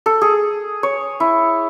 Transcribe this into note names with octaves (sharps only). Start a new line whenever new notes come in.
A4
G#4
C#5
E4